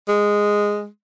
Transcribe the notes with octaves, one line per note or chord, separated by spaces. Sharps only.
G#3